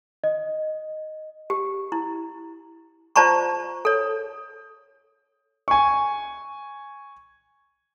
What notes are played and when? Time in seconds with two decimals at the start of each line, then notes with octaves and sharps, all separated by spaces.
0.24 D#5
1.50 G4
1.92 E4
3.16 F4 C5 D5 A5 A#5 C#6
3.85 A4 C#5
5.68 G#5 C#6